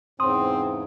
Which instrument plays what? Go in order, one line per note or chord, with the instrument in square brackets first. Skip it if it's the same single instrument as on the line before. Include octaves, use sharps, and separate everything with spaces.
[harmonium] E2 G#2 C#3 [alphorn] C4 [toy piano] C6 [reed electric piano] D#6